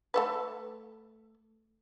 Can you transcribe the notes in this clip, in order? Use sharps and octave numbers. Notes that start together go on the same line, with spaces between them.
A3 A4 B4